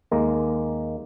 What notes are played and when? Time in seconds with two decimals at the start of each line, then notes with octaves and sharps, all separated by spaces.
0.11 D#2 G#3 A#3 A#5